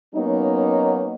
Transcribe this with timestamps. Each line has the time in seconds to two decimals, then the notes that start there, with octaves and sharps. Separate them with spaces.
0.15 F#3 A#3 B3 C#4 D#4